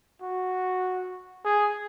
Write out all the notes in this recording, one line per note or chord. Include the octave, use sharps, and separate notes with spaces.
F#4
G#4